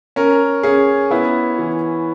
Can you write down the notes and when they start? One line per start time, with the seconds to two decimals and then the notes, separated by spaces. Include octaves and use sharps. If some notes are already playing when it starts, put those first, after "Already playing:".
0.16 C#4 A#4
0.63 C#4 G#4
1.11 B3 E4
1.59 E3